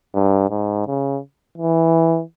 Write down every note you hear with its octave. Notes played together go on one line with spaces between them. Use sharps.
G2
G#2
C#3
E3